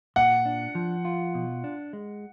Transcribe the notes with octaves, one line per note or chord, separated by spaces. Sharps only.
A#2 F#5
D4
F3
F4
B2
D4
G#3